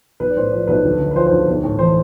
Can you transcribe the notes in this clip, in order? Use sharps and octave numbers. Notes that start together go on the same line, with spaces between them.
B1 B4
D5
A2 C5
F3 D5
B1 B4
D2
D3
B4
F3 C5
C5
D2
B1
A2
E3 C5